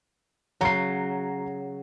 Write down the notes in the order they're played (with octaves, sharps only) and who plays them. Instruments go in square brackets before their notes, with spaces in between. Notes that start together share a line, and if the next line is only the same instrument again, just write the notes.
[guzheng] C#3 F#3 [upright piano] A#5 C7